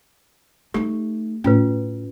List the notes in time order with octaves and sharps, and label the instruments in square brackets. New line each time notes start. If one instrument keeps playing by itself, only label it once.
[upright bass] A3 D#4 [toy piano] G4
[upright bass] A2 [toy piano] C#4 F4 B4